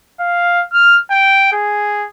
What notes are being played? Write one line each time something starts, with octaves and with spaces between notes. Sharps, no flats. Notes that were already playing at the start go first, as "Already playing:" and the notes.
F5
F6
G5
G#4